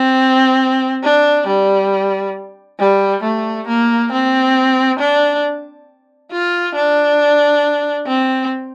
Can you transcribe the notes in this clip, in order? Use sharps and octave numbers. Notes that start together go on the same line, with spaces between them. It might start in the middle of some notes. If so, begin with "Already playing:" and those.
Already playing: C4
D4
G3
G3
A3
A#3
C4
D4
F4
D4
C4